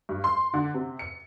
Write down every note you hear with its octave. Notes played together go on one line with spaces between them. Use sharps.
G2
C6
D3
C3
C#7